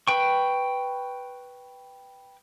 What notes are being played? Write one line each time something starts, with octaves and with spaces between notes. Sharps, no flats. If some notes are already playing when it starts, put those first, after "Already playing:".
B4 G5 C#6